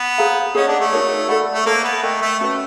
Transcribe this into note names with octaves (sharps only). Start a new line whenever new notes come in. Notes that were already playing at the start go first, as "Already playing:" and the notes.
Already playing: B3
G#4 C5 F5 A#5
C#4 G#4 C5 D#5 F#5
D4
A3
D#4 F#4 A#4 C#5
A3 A4 D5 F#5 B5
A3
A#3 A4 C5 E5
B3
A3 A#4 D#5 G5
A3
A3 C#4 F#4 B4